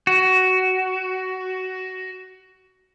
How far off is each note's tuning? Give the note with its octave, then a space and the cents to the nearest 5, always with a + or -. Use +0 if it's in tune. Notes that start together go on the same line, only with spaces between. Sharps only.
F#4 +15